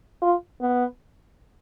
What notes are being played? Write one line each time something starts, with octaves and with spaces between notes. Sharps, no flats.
F4
B3